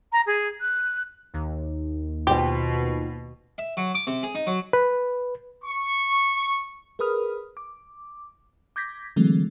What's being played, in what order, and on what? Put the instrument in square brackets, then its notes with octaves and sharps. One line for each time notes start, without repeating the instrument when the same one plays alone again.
[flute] A#5
G#4
F#6
[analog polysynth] D#2
[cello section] B2 [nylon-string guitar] F4 C5 G5 [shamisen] G4
[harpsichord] E5
F#3
D6
C3
G#4
D#4
F#3
[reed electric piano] B4
[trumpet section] C#6
[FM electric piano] G#4 A#4 B4 B5 D#6 F6
D6
D6 G6 G#6 A#6 B6
D3 E3 F#3 G#3 A3 C4